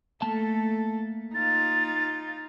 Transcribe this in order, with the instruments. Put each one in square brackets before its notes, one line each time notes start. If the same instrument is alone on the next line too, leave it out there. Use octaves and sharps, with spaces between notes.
[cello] A3 A4 [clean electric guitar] A#3 A5
[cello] D#4 F4 [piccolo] A6